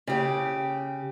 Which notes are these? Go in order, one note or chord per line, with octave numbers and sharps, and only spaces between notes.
C#3 G4